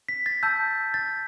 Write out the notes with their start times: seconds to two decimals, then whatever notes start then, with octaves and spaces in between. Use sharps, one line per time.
0.08 B6
0.26 A6
0.43 A5 E6 G6
0.94 A6